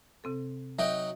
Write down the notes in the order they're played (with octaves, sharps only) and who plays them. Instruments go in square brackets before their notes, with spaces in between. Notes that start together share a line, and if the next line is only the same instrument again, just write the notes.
[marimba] C3 C4 A4
[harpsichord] F#3 D#4 G5 [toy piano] E5